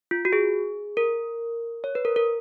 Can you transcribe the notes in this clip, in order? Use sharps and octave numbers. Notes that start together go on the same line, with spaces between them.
F4
F#4
G#4
A#4
C#5
B4
A#4
A#4